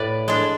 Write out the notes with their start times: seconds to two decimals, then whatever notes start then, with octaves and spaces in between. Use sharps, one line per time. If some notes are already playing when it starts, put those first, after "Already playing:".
Already playing: A2 B4 D5
0.28 G#3 D4